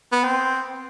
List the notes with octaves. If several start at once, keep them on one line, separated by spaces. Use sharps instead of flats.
B3
C4